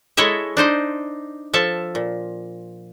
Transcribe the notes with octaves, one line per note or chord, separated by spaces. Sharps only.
G#3 E4 A4 C#5 D#5 E5
D4 D#4 C5 D#5
F3 A4 E5 A5
A#2